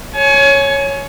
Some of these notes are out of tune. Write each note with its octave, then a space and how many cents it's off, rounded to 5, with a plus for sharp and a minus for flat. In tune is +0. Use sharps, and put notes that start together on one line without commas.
C#5 +0 G#5 +30